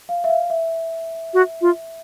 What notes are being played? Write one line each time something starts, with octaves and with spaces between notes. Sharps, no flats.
F5
E5
F5
E5
F#4
F4